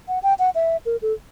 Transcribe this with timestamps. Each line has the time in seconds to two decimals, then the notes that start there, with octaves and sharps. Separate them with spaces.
0.08 F#5
0.23 G5
0.39 F#5
0.55 E5
0.86 A#4
1.02 A4